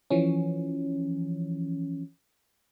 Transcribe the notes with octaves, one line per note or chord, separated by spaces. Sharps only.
E3 F3 C#4